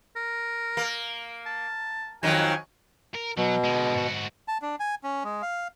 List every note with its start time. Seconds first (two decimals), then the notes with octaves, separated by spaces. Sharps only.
0.16 A#4
0.77 A#3
1.46 A5
2.23 F2 D#3 F#3 G#5
3.14 A#4
3.37 B2 F#3
3.64 D3 G#3
3.95 G#2 F#4
4.48 A5
4.62 D4
4.80 G#5
5.04 C#4
5.24 G#3
5.42 F5